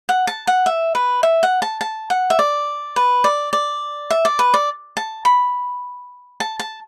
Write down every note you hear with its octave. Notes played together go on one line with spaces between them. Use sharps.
F#5
A5
F#5
E5
B4
E5
F#5
A5
A5
F#5
E5
D5
B4
D5
D5
E5
D5
B4
D5
A5
B5
A5
A5